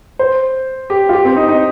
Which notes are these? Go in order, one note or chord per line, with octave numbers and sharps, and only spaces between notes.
C5
G4
F4
G4
C4
D#4
D#4